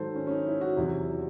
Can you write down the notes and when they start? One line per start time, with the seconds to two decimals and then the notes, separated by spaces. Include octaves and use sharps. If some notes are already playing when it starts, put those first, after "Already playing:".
Already playing: G#2 D#3 F#3 A4 C5
0.15 C#4
0.27 C#4
0.31 D#4
0.47 E4
0.61 F#4
0.76 E2 C3 F#3 E4